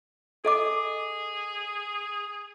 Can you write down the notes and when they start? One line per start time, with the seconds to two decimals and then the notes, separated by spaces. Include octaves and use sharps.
0.45 G#4 A4 D#5 D6